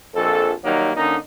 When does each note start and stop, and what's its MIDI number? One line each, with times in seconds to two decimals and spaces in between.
0.15 0.51 34
0.15 0.51 41
0.15 0.51 69
0.64 0.91 51
0.64 0.91 54
0.64 0.91 55
0.64 0.91 58
0.64 0.91 63
0.95 1.16 50
0.95 1.16 58
0.95 1.16 61
0.95 1.16 63